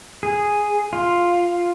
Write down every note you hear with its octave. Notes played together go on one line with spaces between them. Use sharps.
G#4
F4